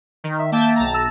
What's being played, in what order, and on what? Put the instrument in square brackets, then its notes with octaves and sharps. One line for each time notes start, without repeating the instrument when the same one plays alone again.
[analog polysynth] D#3
[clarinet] E5
[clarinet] A#3 [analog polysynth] E5 G5 A5
[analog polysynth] B1 A5 A#5
[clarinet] E6